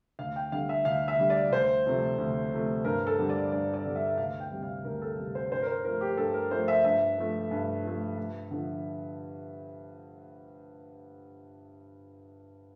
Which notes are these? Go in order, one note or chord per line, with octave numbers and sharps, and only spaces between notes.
D2 F5
G5
D3 G3 F5
E5
D2 F5
E5
D3 G3
D5
D2 C5
C3 F3 A3
D2
C3 F3 A3
G2 A#4
A4
D3 G3
D5
G2 D5
D5
D3 G3
E5
D2 F5
G5
C3 G3
F5
D2 A#4
A4
C3 G3
C5
G2 C5
A#4
C5
F3 A3 A#4
G4
G2 A4
A#4
F3 A3 C5
E5
G2 E5
F3 A3
G2
F3 A3
G2
D3 F3